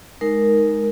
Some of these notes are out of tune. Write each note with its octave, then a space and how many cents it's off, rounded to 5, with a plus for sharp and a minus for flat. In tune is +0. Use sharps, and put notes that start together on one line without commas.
G#3 +10 D#4 +0 A#4 +0